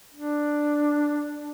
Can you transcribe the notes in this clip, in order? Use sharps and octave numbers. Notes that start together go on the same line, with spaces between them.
D4